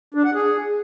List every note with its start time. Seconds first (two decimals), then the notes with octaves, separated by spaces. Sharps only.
0.14 D4
0.24 F#5
0.35 G#4